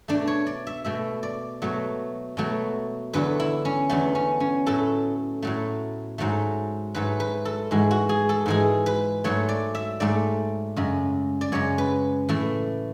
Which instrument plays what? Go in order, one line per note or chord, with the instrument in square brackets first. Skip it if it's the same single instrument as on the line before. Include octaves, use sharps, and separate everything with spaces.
[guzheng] B2 A3 D4
C#5
D5
E5
B2 A3 E5
D5
B2 F#3 A3
B2 F#3 A3
E2 D3 F#3 A3 B4
E4
C#4
E2 D3 F#3 A3 B3
C#4
C#4
A2 F#3 A3 A4
A2 F#3 A3
G#2 F#3 A3
G#2 F#3 A3 B4
B4
A4
G#2 E3 G#3 F#4
F#4
G#4
A4
G#2 E3 G#3 G#4
B4
G#2 F#3 A3 C#5
D5
E5
G#2 F#3 A3 D5
F#2 C#3 G#3
D5
F#2 C#3 G#3 C#5
B4
A2 E3 A3